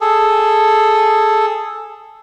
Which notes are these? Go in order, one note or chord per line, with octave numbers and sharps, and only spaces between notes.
G#4 A4